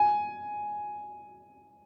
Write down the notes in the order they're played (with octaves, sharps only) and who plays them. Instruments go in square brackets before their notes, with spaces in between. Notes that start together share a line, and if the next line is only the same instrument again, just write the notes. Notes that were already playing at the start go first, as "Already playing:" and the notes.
Already playing: [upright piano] G#5